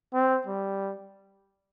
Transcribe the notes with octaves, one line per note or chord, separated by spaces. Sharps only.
C4
G3